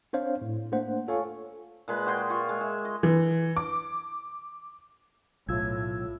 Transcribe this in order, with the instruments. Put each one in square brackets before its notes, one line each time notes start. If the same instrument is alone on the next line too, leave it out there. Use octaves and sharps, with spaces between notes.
[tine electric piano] C4 D4 C5 C#5 F5
A2
A3 A#3 D4 C5 F#5
F4 A4 C#5 F5 G#5 C#6
[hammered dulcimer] A#2 G#3 B4
F#4 G#4 G5 C6
F4 C#6
G#3
E5
D#5
[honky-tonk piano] E3
D6
[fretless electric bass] B1 [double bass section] A2 [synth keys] F4 E6 G#6